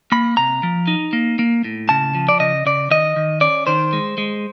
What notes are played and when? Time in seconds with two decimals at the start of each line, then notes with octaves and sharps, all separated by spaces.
0.12 A#3 B5
0.37 C3 A#5
0.63 F3
0.87 D#4
1.13 A#3
1.39 A#3
1.64 A2
1.89 C#3 A5
2.15 F3
2.29 D5
2.40 C#3 D#5
2.66 C#3 D5
2.90 D#3 D#5
3.16 D#3
3.41 C#4 D5
3.67 D#3 C5
3.93 G#3
4.18 G#3